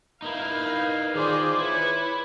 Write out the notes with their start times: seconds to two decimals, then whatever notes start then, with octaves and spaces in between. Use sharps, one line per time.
0.22 D#4 E4 A#4 B4 F5
1.15 D#3 F4 G#4 C5 D5 D6
1.59 E4 B4 C#5